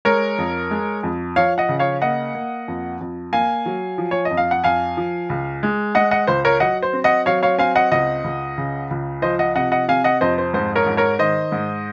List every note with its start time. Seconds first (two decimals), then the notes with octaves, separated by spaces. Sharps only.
0.05 G#3 A#4 C#5
0.38 F2
0.71 G#3
1.03 F2
1.36 F3 C#5 F5
1.58 D#5 F#5
1.69 C#3
1.79 C#5 F5
2.01 A#3 D#5 F#5
2.35 A#3
2.68 F2
3.01 F2
3.33 A#3 F5 G#5
3.66 F#3
3.98 F3
4.11 C#5
4.25 D#5
4.31 F2
4.37 F5
4.51 F#5
4.64 F2 F5 G#5
4.97 F3
5.30 C#2
5.63 G#3
5.95 G#3 D#5 F#5
6.11 D#5 F#5
6.27 C#2 C5
6.45 A#4 C#5
6.60 F#3 D#5 F#5
6.82 C5
6.93 C4
7.04 D#5 F#5
7.26 F#3 C#5 F5
7.43 C#5 F5
7.58 C4 F5 G#5
7.75 D#5 F#5
7.91 C#2 D#5 F#5
8.24 C#2
8.58 C#3
8.91 C#2
9.22 F3 C5 D#5
9.39 D#5 F#5
9.56 C3 D#5 F#5
9.72 D#5 F#5
9.88 C3 F5 G#5
10.04 D#5 F#5
10.21 F2 C5 D#5
10.38 C5
10.54 G#2 C5
10.76 A#4 C#5
10.86 G#2
10.97 A#4 C#5
11.19 D#3 C5 D#5
11.52 G#2